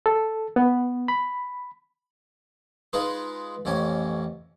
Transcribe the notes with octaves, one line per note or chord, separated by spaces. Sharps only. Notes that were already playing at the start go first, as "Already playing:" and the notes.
A4
B3
B5
G#3 D#4 F4 B4 D#6
A1 F2 C#4 G#5